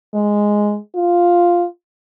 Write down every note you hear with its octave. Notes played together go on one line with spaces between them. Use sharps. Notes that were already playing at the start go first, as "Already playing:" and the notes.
G#3
F4